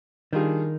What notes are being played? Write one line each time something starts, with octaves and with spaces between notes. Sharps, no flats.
D#3 G3 D4 F4 G#4